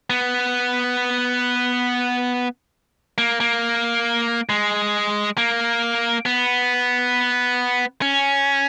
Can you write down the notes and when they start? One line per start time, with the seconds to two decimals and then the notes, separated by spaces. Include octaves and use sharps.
0.10 B3
3.18 A#3
3.40 A#3
4.49 G#3
5.38 A#3
6.26 B3
8.02 C#4